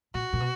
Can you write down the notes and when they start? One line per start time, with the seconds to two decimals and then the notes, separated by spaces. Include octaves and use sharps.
0.14 A#2 F#4
0.33 A#2
0.40 B2